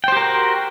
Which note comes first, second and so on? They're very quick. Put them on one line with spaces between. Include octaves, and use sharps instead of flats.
G5 C5 G4 A#4 F#4